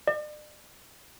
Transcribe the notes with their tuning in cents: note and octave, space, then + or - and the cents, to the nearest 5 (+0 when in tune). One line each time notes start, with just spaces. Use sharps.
D5 +40